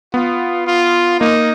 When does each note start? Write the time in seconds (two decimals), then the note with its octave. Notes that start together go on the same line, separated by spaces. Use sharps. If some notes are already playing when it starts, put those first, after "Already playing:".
0.14 B3 F4
0.67 F4
1.20 A#3 D#4